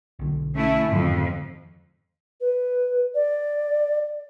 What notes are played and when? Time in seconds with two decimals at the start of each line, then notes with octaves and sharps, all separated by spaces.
0.19 B1 D3
0.57 A3 C#4 E4
0.91 F2 G#2 D3 D#3
2.41 B4
3.15 D5